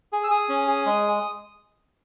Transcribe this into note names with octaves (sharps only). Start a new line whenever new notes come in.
G#4
E6
G#4 D#6
C#4
G#4
G#3